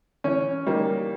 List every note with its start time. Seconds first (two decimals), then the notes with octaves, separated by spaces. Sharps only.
0.24 E3 C#4
0.66 G3 A#3 D#4